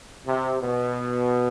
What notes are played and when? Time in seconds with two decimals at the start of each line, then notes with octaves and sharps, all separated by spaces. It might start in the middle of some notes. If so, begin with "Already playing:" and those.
0.25 C3
0.61 B2